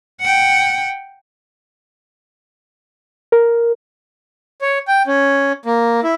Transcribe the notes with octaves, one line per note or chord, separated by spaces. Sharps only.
F#5 G5
A#4
C#5
G5
C#4
A#3
E4